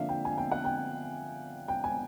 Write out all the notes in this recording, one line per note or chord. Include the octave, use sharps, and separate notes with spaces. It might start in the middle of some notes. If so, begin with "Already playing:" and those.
Already playing: D3 F3 A#3 D4 E5 F5
G5
G#5
G5
F#5
G5
G5
G#5